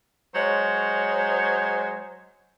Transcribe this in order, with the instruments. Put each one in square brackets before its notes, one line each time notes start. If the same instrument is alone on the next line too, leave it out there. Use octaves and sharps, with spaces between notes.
[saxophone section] F#3 G#3 C5 C#5